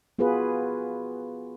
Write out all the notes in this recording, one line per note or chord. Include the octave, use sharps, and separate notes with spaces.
B3 F4 F#4 G#4 B4